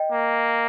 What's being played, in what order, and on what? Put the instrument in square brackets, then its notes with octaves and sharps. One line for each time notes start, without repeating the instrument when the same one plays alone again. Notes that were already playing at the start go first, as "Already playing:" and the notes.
Already playing: [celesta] D#5 G5
[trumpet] A#3